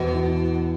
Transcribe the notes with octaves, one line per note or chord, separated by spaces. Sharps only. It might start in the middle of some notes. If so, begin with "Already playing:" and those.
Already playing: E2 B2
E3